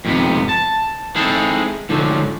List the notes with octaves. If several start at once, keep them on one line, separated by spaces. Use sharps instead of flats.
F2 G#2 C3 B3
A5
G#3 C4 D#4 E4 G#4 A4
G#2 D3 F3 F#3